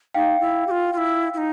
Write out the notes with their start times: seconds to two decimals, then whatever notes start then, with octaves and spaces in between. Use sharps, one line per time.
0.14 D#4 F5 G5
0.41 E4
0.67 G4
0.71 F4
0.93 F4
0.98 E4
1.34 E4
1.38 D#4